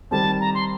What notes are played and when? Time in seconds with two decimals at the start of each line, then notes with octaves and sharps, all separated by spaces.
0.11 D#3 G3 C4 A5
0.40 A#5
0.54 C6